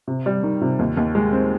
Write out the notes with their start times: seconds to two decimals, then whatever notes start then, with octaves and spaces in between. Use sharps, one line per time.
0.07 C3
0.26 G3
0.43 D#3
0.61 C3
0.79 D#2
0.97 D#2
1.15 G#3
1.33 C4